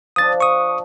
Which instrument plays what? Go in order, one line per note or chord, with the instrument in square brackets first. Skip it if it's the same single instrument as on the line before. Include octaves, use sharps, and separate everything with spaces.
[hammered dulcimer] F3 D4 [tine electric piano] D#6 A6
[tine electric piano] C#6 D#6